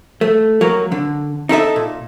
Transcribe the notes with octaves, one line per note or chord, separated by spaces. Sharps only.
A3
F#3 A#3
D3
D#4 E4 A4 E5
A#2